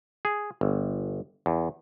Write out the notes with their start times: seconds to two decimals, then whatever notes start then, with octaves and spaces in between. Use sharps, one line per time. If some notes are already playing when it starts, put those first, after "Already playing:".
0.25 G#4
0.61 G1
1.46 E2